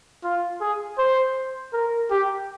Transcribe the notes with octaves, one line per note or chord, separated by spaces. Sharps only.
F4
G#4
C5
A#4
G4